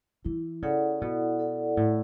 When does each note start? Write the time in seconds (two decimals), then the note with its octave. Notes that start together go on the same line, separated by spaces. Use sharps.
0.25 E3 E4
0.62 C#3 A4 D5 F#5
1.01 B2 E4
1.39 A4 D5 F#5
1.77 A2 E4